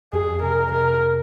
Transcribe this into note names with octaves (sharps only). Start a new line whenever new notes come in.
F2 G#4
C3 A#4
C3 A#4